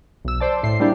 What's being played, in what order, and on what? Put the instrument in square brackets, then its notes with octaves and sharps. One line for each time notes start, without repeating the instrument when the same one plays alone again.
[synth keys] B1 E6
C5 D5 A5
A2 C7
G3 G#3 A#3 D4 E4 G4